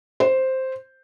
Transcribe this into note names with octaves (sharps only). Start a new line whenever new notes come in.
C5